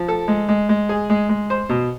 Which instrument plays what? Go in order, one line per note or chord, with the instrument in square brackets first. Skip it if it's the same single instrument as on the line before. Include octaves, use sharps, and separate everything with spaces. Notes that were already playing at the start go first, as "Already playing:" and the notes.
Already playing: [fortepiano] F3
A4
G#3
G#3
G#3
G#4
G#3
G#3
C5
B2